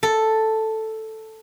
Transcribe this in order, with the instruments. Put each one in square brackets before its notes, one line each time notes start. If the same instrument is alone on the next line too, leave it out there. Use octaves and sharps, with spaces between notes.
[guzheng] A4